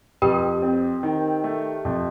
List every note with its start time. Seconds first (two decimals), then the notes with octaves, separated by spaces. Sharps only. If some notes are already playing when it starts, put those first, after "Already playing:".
0.22 F2 G4 G5
0.62 C4
1.03 D#3
1.44 A3
1.85 F2